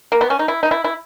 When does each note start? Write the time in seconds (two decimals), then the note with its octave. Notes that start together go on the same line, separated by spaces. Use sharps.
0.12 A#3
0.21 B3
0.30 C#4
0.39 D#4
0.48 E4
0.63 D#4
0.71 E4
0.84 E4